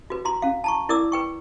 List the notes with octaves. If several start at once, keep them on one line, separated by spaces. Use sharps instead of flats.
F#4 B4
F#4 A#5 C6
C#4 F5
A5 A#5 C#6
E4 A#4 D5 D6 E6
B4 G5 C#6